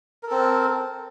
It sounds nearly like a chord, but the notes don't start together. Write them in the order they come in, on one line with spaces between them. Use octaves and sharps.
A#4 A4 C4